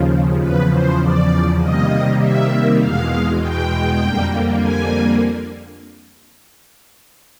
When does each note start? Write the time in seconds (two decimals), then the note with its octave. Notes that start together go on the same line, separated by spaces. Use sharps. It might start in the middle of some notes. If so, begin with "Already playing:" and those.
Already playing: D#2 C#3 F3
0.40 E2 C#3 F3 B4
0.70 C5
1.00 D5
1.59 C3 D#3 G3 A#3 D#5
2.19 E5
2.79 E2 B2 G#3 F5
3.39 G5
3.99 F2 D3 G3 A#3
4.59 G#5